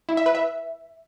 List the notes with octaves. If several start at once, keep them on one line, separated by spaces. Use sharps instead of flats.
E4
E5
B4
E5